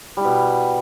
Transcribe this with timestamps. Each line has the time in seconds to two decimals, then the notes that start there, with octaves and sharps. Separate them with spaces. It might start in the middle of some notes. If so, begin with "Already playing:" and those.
0.17 G3
0.21 E4
0.25 B2